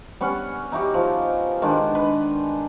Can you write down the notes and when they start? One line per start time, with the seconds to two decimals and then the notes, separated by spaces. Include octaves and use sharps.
0.20 G3 B3 C#4 F#5
0.72 D#4 E4 F#4 G4
0.94 F3
1.62 D#3 G#3 D4
1.95 B4